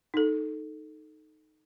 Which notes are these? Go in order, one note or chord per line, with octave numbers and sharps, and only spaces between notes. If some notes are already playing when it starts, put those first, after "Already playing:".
D#4 A4